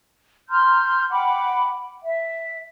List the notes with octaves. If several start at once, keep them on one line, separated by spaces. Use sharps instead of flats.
A#5 C6 F6 G6
F#5 G5 B5 D6
E5